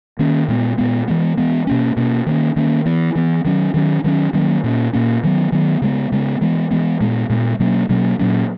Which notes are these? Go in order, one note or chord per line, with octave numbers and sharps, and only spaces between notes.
D#3 A#3 C#4
A#2 G#3 B3
A#2 G#3 B3
E3 G#3 B3
E3 G#3 B3
B2 A#3 C#4
B2 A#3 C#4
D#3 A#3 C#4
D#3 A#3 C#4
E3 B3
E3 B3
D#3 F#3 C#4
D#3 F#3 C#4
D#3 F#3 A#3 C#4
D#3 F#3 A#3 C#4
A#2 A#3 C#4
A#2 A#3 C#4
D#3 F#3 B3
D#3 F#3 B3
C#3 G#3 B3
C#3 G#3 B3
E3 G#3 B3
E3 G#3 B3
A#2 G#3 B3
A#2 G#3 B3
B2 F#3 A#3 C#4
B2 F#3 A#3 C#4
A#2 F#3 A#3 C#4